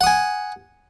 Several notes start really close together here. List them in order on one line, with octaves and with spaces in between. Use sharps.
F#5 D#6 G#5